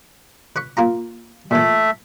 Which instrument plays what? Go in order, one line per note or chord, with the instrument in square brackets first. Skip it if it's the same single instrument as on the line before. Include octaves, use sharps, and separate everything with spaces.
[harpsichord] B4 B5 C#6
A#3 F4 A#5
[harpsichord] A#2 E3 [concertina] A3 E5